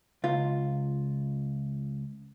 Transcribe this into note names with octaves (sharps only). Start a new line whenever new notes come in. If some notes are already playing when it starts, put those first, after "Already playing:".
C#2 F4